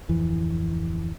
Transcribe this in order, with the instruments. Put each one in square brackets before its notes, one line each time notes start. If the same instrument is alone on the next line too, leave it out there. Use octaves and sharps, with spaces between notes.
[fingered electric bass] D1 F2 E3